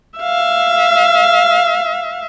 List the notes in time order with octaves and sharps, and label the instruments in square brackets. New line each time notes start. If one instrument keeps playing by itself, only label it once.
[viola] E5 F5